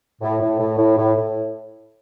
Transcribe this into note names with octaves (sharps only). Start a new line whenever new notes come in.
A2
A2
A2
A2
A2
A2